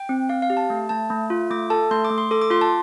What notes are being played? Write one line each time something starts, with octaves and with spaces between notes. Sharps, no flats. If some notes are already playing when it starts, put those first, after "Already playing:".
Already playing: G5
C4
C4 F5
F5
G4
A5
A3
A3 A5
A3
F4
A3 D6
A4 A5
A3 C6
D6
A3
C6
A4 D6
D6
F4 C6
A5